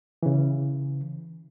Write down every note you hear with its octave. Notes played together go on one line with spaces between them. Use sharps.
C#3 E3